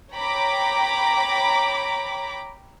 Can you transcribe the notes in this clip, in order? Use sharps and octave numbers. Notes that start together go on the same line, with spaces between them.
C#5 G5 A#5 B5 D6